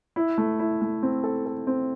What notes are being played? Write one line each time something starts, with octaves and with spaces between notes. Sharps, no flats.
E4
A3
E4
A3
C4
A4
A4
C4